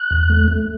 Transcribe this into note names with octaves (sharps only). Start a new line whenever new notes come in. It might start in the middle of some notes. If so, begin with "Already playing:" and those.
Already playing: F#6
E2
A3
A3